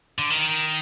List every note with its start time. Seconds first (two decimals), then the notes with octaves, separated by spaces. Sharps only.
0.19 D3
0.30 D#3